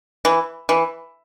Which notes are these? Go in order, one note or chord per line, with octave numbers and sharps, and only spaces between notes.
E3
E3